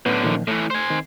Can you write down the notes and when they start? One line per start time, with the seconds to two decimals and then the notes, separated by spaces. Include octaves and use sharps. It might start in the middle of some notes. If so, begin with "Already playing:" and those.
0.06 F#2 A2 D3 B3 B4
0.23 A#2 D#3 F3
0.48 A2 E3 A3
0.70 C5 G#5
0.90 D#3 C4